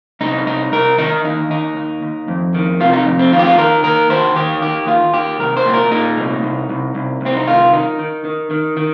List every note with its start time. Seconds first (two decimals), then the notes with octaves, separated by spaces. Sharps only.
0.21 C2 D#4
0.46 C2 D#4
0.72 C2 A#4
0.98 D#3 D#4
1.24 D#2 D#4
1.50 D#2 D#4
1.76 D#2
2.02 D#2
2.28 F2
2.54 D#3
2.80 C3 F4
2.93 D#4
3.06 F2
3.19 C4
3.32 D#3 F4
3.39 G4
3.46 F4
3.58 D#2 A#4
3.84 D#3 A#4
4.10 D#2 C5
4.36 D#3 G4
4.61 D#2 G4
4.88 D#2 F4
5.13 D#3 G4
5.39 C2 A#4
5.57 C5
5.65 A#2
5.74 A#4
5.91 A#2 D#4
6.17 C2
6.43 C2
6.69 C2
6.95 C2
7.21 C2
7.26 C4
7.37 D#4
7.47 D#3 F4
7.73 D#3 D#4
7.99 D#3
8.25 D#3
8.51 D#3
8.77 D#3